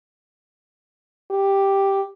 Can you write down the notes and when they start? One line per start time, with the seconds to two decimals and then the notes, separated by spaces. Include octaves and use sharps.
1.31 G4